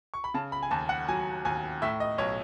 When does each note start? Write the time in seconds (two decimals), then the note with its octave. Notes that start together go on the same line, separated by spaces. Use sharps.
0.14 C#6
0.24 B5
0.34 C#3 A5
0.52 B5
0.62 G#5
0.71 D#2 A5
0.89 F#5
1.08 F#3 G#5
1.45 D#2 G#5
1.82 A2 E5
2.00 D#5
2.18 B1 C#5